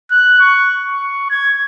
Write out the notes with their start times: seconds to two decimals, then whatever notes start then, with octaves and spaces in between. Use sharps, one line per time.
0.11 F#6
0.40 C#6
0.85 C#6
1.30 G#6